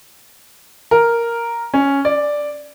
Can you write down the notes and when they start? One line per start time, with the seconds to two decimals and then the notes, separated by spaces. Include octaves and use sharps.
0.91 A#4
1.74 C#4
2.05 D5